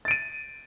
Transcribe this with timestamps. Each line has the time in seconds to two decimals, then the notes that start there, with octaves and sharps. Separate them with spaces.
0.05 A6
0.08 D7
0.11 D#7